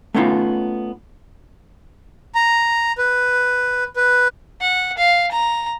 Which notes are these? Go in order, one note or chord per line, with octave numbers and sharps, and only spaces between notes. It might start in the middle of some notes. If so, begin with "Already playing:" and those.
A3 B3 C#4 D#4 F4
A#5
B4
B4
F#5
F5
A#5